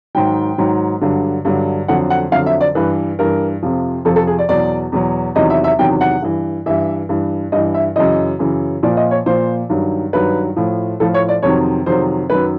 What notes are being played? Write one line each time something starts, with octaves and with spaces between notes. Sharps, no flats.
G#2 D#3 F#3 G5
G#2 D#3 F#3
G2 D3 F#3
G2 D3 F#3
F2 D3 F#3 F#5
F#5
F2 D3 F#3 F5
E5
D5
G2 E3 B4
G2 E3 A#4
F2 C3 F3
F2 C3 F3 A4
A4
G#4
D5
E2 B2 F#3 D5
E2 B2 F#3
E2 C3 D#3 F#3 D#5
E5
E5
E2 C3 D#3 F#3 G5
F#5
G2 E3
G2 E3 E5
G2 E3
G2 E3 D#5
E5
F#2 C#3 E3 D#5
F#2 C#3 E3
A#2 F3 D5
D#5
C#5
A#2 F3 C5
G2 D#3 F#3
G2 D#3 F#3 B4
A2 F3
A2 F3 A4
C#5
D5
F2 C3 D#3 F#3 C#5
F2 C3 D#3 F#3 C5
F#2 D#3 F#3 B4